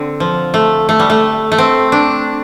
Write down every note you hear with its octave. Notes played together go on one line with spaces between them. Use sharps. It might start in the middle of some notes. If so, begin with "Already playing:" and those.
Already playing: D3 C4
F3
A3
A3
G3
A3
A3
C4
D4